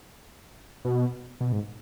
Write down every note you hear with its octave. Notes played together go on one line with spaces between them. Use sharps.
B2
B2
G#2